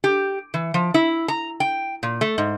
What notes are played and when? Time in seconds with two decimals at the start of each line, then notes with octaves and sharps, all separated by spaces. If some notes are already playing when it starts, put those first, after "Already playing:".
0.04 G4
0.54 E3
0.74 F3
0.94 E4
1.28 A#5
1.60 G5
2.03 A#2
2.21 A3
2.38 G#2